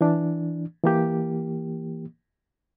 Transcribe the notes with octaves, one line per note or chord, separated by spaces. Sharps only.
E3 D4
E3 A#3 G4